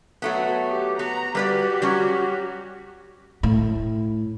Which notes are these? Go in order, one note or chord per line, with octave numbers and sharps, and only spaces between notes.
F#3 A3 B3
G4
B3 A#5
G3 F#4 G4 B4 D5
F#3 G3 C#4
A2